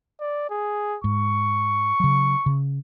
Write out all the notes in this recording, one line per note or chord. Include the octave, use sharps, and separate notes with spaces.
D5
G#4
G#2 C#6
C#3 F#3
C#3